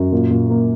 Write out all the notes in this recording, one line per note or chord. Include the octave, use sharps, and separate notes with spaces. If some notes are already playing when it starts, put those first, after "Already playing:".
Already playing: F#2
A#2
A#2
A#3